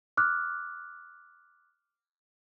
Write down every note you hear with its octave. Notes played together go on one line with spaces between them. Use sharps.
D6 F6 F#6